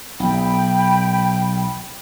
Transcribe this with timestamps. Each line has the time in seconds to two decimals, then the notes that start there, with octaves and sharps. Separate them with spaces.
0.20 B1 G5 B5